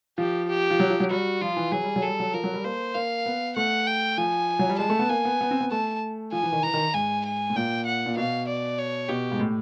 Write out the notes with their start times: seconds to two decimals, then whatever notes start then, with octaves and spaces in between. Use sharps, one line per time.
0.18 F3 G4
0.49 G4
0.71 F3
0.79 F#3
0.90 F3
1.00 F#3
1.10 G3 F#4
1.41 F3 F4
1.57 E3
1.72 F#3 G#4
1.84 G3
1.96 F#3
2.02 A4
2.08 G3
2.20 F#3
2.33 F3 A#4
2.44 F#3
2.54 G3
2.64 A#3 C5
2.95 A#3 F5
3.26 B3
3.56 A3 F#5
3.87 G5
4.17 F3 G#5
4.59 F#3
4.69 G3
4.79 G#3 A5
4.90 A3
4.99 B3
5.09 A#3 G#5
5.25 B3
5.41 B3
5.51 C4
5.61 B3
5.71 A3 A5
6.32 F3 G#5
6.43 E3
6.52 D#3
6.63 E3 A#5
6.74 D#3
6.94 G#2 G#5
7.25 G#5
7.50 A2
7.56 A#2 G5
7.86 F#5
8.06 A#2
8.17 B2 F5
8.47 D5
8.78 C#5
9.09 B2 G4
9.32 G#2
9.40 A2